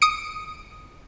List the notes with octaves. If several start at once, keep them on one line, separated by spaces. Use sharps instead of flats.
D#6 C#7 D7